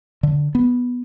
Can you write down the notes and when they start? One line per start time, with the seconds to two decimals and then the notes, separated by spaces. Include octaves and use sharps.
0.23 D3
0.55 B3